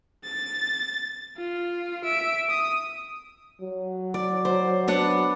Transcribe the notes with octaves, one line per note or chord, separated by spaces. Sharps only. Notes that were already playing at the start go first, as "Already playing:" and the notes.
A6
F4
E5 D7
D#6
F#3
D5
C5
B3 D4 F#5